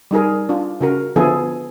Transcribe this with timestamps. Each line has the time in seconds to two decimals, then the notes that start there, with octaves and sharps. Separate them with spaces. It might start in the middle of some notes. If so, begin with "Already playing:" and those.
0.11 G3 D#4 G#4 A#4
0.49 D4 F4
0.81 C#3 F#4 A#4
1.16 D3 F3 B3 E4 G#4 A4